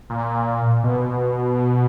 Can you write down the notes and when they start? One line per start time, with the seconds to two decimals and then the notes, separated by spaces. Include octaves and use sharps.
0.10 A#2
0.84 B2